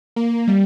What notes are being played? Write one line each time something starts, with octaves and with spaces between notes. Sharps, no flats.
A#3
G3